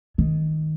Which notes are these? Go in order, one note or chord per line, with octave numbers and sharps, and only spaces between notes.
D#3